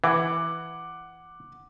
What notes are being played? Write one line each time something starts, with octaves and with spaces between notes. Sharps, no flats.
E3 F#5 D6